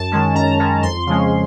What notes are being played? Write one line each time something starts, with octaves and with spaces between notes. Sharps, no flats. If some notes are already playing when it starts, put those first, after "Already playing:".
Already playing: F#2 A5
D#3 G#3 C#4
F#2 A#5
D#3 G#3 C#4
F2 C6
C#3 F3 G#3 C#4